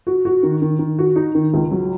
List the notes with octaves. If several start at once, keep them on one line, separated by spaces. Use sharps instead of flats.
F#4
F#4
D#3
D#3
D#3
F#4
D#4
D#3
C#2
F#3